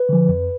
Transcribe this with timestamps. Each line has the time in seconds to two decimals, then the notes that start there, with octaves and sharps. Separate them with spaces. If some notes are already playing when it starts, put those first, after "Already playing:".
Already playing: B4
0.09 D3 F3
0.28 F2